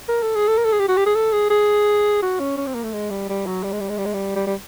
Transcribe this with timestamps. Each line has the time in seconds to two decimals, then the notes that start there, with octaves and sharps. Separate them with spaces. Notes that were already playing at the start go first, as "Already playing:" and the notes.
0.08 A#4
0.22 A4
0.35 G#4
0.48 A4
0.57 A#4
0.65 A4
0.73 G#4
0.80 G4
0.88 F#4
0.97 G4
1.06 G#4
1.15 A4
1.33 G#4
1.50 G#4
2.22 F#4
2.40 C#4
2.57 C#4
2.67 C4
2.75 A#3
2.84 A3
2.93 G#3
3.10 G3
3.29 G3
3.46 F#3
3.64 G3
3.72 G#3
3.80 G3
3.89 G#3
3.98 G3
4.05 G#3
4.14 G3
4.35 G3
4.47 G3